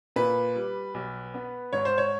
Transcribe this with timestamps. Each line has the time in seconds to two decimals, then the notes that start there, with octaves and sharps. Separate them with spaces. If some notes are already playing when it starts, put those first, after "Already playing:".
0.16 A#2 B4
0.56 G3
0.94 B1
1.34 B3
1.73 G#2 C#5
1.85 C5
1.98 C#5